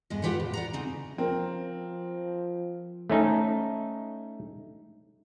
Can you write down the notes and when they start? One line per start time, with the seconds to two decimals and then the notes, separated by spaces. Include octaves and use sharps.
0.10 G2 G#3 B3 D#5
0.22 F4 G4 B4 C5 F#5
0.40 A2
0.54 D5 F#5 A#5
0.73 C#3 E3 C4 D#4
1.18 F3 C4 A#4
3.10 A3 C#4 D#4